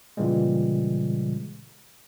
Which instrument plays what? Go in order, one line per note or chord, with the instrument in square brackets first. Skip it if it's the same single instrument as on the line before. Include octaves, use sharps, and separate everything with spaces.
[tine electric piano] A#2 C#3 E3 G3 G#3